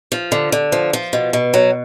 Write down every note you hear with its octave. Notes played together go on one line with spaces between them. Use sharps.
F3
D3
D3
F3
F3
B2
B2
F#3